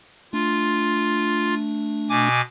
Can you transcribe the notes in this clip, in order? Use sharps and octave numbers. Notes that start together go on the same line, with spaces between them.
A3 D4 F4
B2 G#5 D6